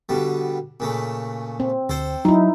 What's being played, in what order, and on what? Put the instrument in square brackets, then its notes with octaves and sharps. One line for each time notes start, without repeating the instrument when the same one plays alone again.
[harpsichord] B2 D3 G3
A#2 C#3 A3
[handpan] C4
[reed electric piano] D2 [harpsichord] A4 C5 G5
[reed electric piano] F#3 [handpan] D#4 E4